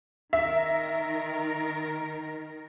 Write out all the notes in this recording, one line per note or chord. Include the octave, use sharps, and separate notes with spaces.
D#3 A#4 E5